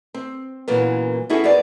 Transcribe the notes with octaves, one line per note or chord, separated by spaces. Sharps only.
C4
A#2 C#3 E3 F#3 A#3 B3
B3 C#4 E4 F#4 G#4 A4
F#2 B3 G#4 D5